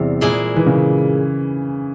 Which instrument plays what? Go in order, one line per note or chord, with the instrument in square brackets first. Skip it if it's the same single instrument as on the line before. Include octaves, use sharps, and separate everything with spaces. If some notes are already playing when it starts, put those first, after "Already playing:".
Already playing: [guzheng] E2 C3 G3
A#2 G#3 E4 G#4
[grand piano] E3
C#3